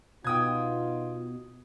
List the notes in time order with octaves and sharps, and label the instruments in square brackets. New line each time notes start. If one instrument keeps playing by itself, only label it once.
[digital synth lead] B2 [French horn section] B3 D#4 F4 [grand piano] G5 D#6 G#6